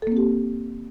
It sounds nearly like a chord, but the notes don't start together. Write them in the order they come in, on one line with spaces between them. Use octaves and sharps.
A4 A#3 C4 G4